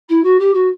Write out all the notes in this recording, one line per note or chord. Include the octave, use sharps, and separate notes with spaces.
E4
F#4
G4
F#4